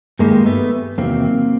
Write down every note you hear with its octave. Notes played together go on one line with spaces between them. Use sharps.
G2 D#3 G3 G#3 A#3
A3 B3
E2 C3 D#3 F#3 A#3 C4